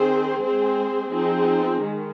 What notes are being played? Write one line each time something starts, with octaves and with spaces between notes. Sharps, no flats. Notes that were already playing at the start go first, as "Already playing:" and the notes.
Already playing: D#3 C4 G#4 C5
G#3 C4 G#4 C5
F3 C4 D#4 G#4
D#3 G#3